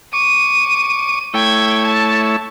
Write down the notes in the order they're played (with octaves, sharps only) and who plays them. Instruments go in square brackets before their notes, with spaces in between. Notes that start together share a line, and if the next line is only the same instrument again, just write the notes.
[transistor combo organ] C#6 D6 [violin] D#7
[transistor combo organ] A3 E4 C#5 [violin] G5 G#6
[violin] A5